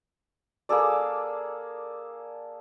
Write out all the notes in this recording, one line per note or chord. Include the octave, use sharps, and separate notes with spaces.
A#3 G#4 A4 D5